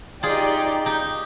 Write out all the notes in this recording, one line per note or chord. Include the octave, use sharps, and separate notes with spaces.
D#4 F4 G4 G#4 D5 G5
D#4 G4